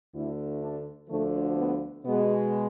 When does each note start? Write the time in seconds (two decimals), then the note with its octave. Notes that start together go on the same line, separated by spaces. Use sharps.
0.14 D2 D3 A3 E4
0.62 D4
1.09 D2 D3 F3 A3
1.57 B3
2.04 B2 G#3 B3